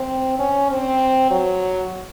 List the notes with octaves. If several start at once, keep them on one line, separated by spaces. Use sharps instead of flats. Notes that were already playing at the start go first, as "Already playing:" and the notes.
Already playing: C4
C#4
C4
F#3